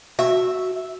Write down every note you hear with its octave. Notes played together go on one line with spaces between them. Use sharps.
F#4 E5